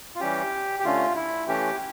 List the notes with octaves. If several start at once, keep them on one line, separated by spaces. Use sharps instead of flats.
F4
E3 G3 C#4 G4
G4
D3 A3 C#4 F4
E4
E3 A3 C#4 G4